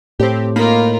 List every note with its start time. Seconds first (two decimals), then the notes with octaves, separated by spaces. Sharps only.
0.20 A2 C4 G4
0.56 A#3 D#4 F4 A#4 B5